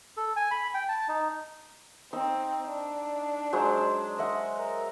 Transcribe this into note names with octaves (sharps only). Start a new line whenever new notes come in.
A4
G#5
B5
G5
A5
D#4
C4 D#4 E6
D4
F#3 G#3 C5
D#5 E5 F#5
A#4